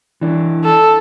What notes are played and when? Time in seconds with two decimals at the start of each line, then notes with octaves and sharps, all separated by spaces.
0.21 E3 D4
0.64 A4